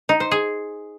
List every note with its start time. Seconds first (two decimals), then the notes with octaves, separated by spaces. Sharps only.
0.09 D#4
0.20 C5
0.32 G#4